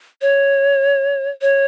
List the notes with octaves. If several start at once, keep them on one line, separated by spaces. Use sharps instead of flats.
C#5
C#5